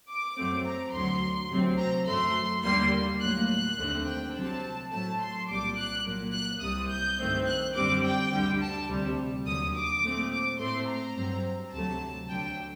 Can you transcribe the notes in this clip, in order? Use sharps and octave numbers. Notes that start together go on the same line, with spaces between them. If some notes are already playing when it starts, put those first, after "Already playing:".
D6
F#2 F#3 A3 C4
A#5
D2 D3 F#3 C6
D2 C3 F#3 C4
A#5
F#2 F#3 A3 C6
D#2 D3 G3 A#3 C6
A2 F#3 A#3 F#6
F#6
D#2 D3 A3 C4
G5
C2 C3 F#3 C4 A5
A2 F#3 A3 A5
C6
C2 A#2 G3 D6
F#6
A#2 F#3 A#3
F#6
C2 C3 G3 D#6
G6
G2 D#3 A3 C4
F#6
F#2 D3 G3 C4 D6
G5
D2 D3 G3
A5
D2 C3 G3
D#2 D3 F#3 D#6
D6
A#2 A3 C4
D6
A2 A3 C4 C6
A#5
G2 F#3 C4
D2 C3 F#3 A3 A5
D2 D3 F#3 G5